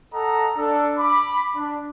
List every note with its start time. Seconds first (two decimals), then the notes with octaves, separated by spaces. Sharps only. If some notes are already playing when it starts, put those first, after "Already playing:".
0.13 A4 D#5 F#5 A#5
0.56 D4 A4
0.97 B5 D6
1.55 D4